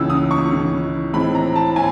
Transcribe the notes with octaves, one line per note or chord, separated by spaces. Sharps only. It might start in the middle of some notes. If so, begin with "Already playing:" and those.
Already playing: C#2 C#3 E3 E6
D#6
C#6
C#2 C#3 E3
A2 E3 G#3 C4 B5
A#5
A5
A2 G#5